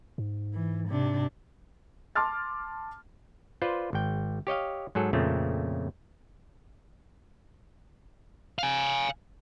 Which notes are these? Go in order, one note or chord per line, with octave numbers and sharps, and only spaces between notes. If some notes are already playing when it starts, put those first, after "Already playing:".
G#2
E3
C3 D4
A5 C6 D6 F6 A6
F4 B4 C5 D5
G#1 G5
G4 C#5 D#5 F5
G#2 F#3 G#4 A4
F2 A#2 C#3 A3 C4
F5 G#5